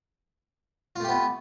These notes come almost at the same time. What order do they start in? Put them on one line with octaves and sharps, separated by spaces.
F4 A3 G4 B3